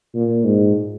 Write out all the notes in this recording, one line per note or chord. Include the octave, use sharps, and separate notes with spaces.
A#2
G#2